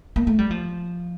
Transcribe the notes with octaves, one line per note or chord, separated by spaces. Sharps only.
A#3
A3
G3
F3